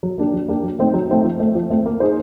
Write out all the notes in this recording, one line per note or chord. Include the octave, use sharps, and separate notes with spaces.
F#3
A#3 D4 G4
F#3
A#3 D4 G4
F#3
A3 C4 D#4
F#3
A3 C4 D#4
F3
A3 C4
F3
A3 C4
A#3
D#4 G#4 C5